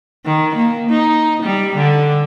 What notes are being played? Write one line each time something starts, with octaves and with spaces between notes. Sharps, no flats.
D#3
A#3
D#4
G3
D3